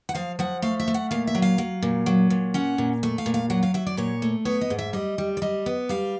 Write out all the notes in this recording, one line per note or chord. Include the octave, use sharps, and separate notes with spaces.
F#5
F3 F5
F3 F#5
A3 F5
E5
A3
F#5
A#2 F5
E5
F#3
F5
F#3
A#2
F#3
A#2
C#4 F#5
A#2
A3
F5
A#2
F5
F#3 F#5
F5
F#3 E5
D5
A#2 C#5
A3
B3 C#5
D#5
G#2
E5
G3 D#5
G3
D5
G3 D#5
B3
G3 F5